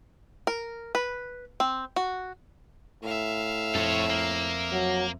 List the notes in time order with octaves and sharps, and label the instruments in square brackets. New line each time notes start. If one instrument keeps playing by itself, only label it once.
[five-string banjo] A#4
B4
C4
F#4
[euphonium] A2 [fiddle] E5 F5
[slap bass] F2 [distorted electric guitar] A4 C#5
[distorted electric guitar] A#3
[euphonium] F#3